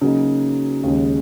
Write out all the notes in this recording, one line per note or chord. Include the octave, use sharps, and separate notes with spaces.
C#3 F#3 A#3 D#4
D#2 C#3 G#3